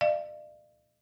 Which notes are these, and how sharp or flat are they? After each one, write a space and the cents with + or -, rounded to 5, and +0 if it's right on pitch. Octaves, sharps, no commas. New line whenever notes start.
D5 +40 F5 -40